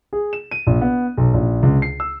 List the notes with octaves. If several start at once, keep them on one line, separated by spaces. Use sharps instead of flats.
G#4
E7
D#7
A#1
B3
B1
A#1
C#2
C7
E6